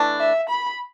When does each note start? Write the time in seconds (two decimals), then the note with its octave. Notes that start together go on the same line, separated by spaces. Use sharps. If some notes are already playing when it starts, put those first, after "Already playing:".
Already playing: E3 A3 D4
0.20 E5
0.49 B5